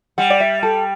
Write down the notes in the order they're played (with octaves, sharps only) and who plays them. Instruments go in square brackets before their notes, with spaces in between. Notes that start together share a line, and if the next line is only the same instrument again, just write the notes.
[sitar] G3 [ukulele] F#5
[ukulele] D5
E5
A4